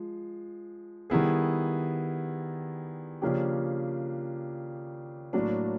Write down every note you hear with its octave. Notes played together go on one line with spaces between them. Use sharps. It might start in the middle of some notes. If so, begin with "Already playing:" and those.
Already playing: F3 G#3
D#3 G3 B3 E4 G#4
C#3 F3 A#3 D4 G4
A2 F#3 A#3 D4